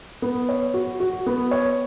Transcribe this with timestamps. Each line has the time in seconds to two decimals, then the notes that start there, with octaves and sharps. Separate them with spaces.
0.22 B3
0.49 C#5
0.74 F#4
1.00 F#4
1.26 B3
1.51 C#5